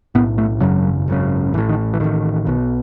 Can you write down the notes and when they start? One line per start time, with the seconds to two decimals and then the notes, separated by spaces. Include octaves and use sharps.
0.15 B1 A2 B3
0.38 A3
0.61 G#1 F#2 C#3 F#3
1.08 G#1 F#2 C#3
1.54 A1 E3
1.58 A2
1.69 D#3
1.94 E3
2.00 A1 A2 D#3
2.47 B1 B2